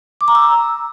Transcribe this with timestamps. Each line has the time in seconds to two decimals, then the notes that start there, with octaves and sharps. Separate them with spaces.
0.21 D6
0.28 A#5
0.35 E6